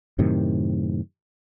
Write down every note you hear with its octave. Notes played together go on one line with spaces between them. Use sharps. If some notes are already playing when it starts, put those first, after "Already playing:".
F#2 A2 C3 D#3